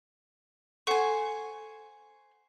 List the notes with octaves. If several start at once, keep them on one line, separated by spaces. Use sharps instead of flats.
A4 C5 F#5 G#5 C#6